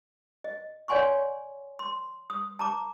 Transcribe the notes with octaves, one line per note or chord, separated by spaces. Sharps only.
D#5
C#5 D5 F#5 G#5 C6 C#6
C6
D#6
A5 A#5 D6